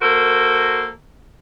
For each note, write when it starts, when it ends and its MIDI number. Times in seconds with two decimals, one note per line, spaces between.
0.02 0.89 58
0.02 0.89 66
0.02 0.89 69
0.02 0.89 70
0.02 0.89 72